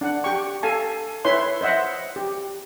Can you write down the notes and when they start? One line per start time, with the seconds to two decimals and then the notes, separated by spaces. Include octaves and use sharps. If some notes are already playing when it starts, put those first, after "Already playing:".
0.01 D4 F#5
0.24 G4 G5 C#6
0.63 A4 F5 G#5 A5
1.25 E4 B4 C#5 E5 C6
1.61 C5 D#5 E5 F#5
2.16 G4